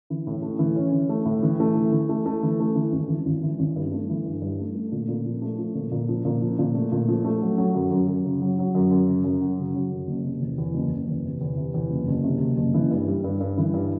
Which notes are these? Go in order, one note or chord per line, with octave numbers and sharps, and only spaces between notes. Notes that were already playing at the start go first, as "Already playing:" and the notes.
E3
A2
A3
E3
C#4
E3
A3
A2
E3
A3
E3
E3
A3
A3
E3
A3
E3
G#1
E3
G#1
E3
G#1
G2
A3
E3
G2
G2
A3
A3
A#2
A#2
F3
A3
F3
A#2
A#2
F3
A#2
F3
A#2
A3
A#2
F3
A3
F#3
F#3
F#2
F#2
F#2
C#3
F#3
F#3
F#2
F#2
C#3
F#2
F#3
C#3
F#3
F#2
F#1
C3
E2
E2
F#1
F#1
E2
C3
E2
C3
E2
F#1
F#1
C3
F#1
F#1
E3
G2
G3
G2
G2
E3
G2